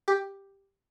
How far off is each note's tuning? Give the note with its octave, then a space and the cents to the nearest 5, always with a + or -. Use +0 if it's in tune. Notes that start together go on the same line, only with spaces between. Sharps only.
G4 +5